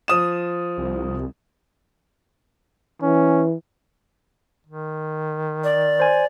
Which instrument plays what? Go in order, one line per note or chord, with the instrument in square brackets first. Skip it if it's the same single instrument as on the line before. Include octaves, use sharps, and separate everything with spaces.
[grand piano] F3 D#6 E7
[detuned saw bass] C2
[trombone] E3 [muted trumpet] C#4
[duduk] D#3
[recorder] D5
[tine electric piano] C5 G#5